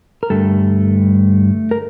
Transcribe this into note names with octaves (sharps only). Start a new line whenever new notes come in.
A#4
G2 D3 G3 A3 A4
A#4